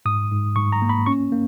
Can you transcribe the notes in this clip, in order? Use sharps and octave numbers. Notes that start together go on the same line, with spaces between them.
G#2 D#6
G#2
G#2 C#6
A#5
A#3
B5
C#4 C#6
A#3